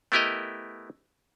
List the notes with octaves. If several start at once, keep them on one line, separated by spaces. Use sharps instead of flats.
A3 B3 E4 G4 A#4 D#5